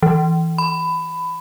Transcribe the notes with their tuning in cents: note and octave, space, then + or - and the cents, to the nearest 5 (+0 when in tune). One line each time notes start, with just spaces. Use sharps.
E3 -5
B5 +20